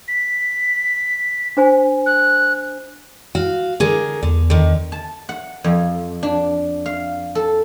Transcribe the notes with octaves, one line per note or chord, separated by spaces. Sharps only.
B6
D4 C5 G#5
F#6
F#4 F5
D3 G#4 A#4
E2 D3
D3 D#3
A5
F#5
F2
D4
F5
A4